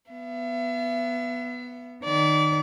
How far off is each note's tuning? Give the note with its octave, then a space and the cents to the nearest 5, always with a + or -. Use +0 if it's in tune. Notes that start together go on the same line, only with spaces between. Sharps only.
B3 +0 E5 +40
D#3 -30 D5 -30